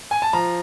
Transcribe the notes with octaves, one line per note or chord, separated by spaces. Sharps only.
G#5
A5
F3 A#5